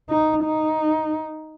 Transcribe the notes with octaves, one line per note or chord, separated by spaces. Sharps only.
D#4
D#4